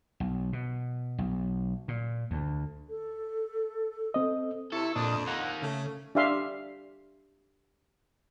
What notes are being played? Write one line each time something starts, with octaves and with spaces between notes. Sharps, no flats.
B1
B2
B1
A#2
D2
A4
C4 D#5
C3 E4 A4 C#6
F2 A#2 D4 D#5
A#3 D#4 F#5
C#3 A3
D4 G4 E5 F5 C6